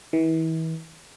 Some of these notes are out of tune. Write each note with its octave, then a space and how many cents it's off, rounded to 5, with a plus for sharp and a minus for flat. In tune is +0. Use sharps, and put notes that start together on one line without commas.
E3 -35